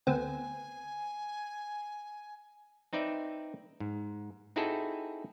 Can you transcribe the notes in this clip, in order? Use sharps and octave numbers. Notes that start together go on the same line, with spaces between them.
D2 B3 C4 G#5
C4 D#4 B4 D5 E5
G#2
C4 D#4 E4 F#4 G#4 A4